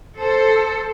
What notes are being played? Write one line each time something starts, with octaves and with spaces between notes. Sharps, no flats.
A4 C5